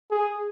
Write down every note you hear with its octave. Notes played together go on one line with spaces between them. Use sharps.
G#4